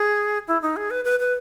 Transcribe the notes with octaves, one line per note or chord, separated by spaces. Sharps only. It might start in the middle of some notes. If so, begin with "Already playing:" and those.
Already playing: G#4
E4
D#4
G#4
B4
B4
B4